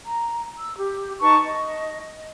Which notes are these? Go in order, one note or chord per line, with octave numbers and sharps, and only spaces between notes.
A#5
E6
G4
D#4 B4 A5 C#6
D#5